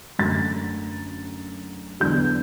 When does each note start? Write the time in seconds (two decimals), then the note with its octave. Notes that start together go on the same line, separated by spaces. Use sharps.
0.19 F#2 D3 A3 A6
2.00 E2 D3 F#3 B3 G6